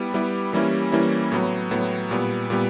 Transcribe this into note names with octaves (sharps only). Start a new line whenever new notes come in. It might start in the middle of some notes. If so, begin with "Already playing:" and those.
Already playing: G3 B3 E4 G4
G3 B3 E4 G4
E3 G3 A#3 C#4 E4
E3 G3 A#3 C#4 E4
A2 F#3 B3
A2 F#3 B3
A#2 G3 B3
A#2 G3 B3